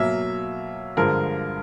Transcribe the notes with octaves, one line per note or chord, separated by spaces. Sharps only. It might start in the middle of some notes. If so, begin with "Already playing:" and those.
Already playing: B2 F#3 A#3 E5
G2 D3 F3 G#3 A#4